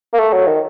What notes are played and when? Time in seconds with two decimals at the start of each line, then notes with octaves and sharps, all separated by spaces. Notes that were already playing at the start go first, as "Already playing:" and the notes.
0.13 A#3
0.18 A3
0.33 F#3
0.47 D#3